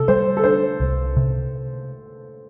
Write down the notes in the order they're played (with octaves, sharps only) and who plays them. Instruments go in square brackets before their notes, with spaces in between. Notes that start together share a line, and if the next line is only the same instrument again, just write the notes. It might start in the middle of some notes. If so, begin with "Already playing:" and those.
Already playing: [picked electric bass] C3 [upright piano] A4
[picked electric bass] G3 [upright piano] C5
[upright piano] A4
[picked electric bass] D4 [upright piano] C5
[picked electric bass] C2
C3